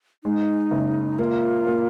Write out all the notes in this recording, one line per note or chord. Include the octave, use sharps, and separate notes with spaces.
G#3 D#4
F#1
A#3 F4
A#3